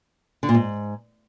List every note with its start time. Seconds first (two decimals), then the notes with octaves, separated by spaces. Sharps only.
0.43 D3
0.49 A#2
0.54 G#2